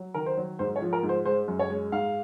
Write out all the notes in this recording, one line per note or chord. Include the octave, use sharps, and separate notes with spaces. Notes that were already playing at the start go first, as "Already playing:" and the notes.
Already playing: F#3
D#3 A#4
C5
F#3
G#2 C5
C#5
F3
A#4
G#2
C5
G#3 C5
F#2
C#5
G#3
G#2 F5